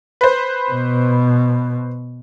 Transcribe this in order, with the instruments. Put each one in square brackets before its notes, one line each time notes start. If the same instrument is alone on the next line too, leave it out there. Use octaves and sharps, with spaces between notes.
[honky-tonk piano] B4 C5
[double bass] B2